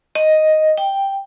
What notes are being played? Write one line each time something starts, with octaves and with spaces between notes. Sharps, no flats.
D#5
G5